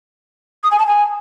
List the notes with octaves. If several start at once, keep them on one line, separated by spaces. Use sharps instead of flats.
D#6
G#5
A5
G#5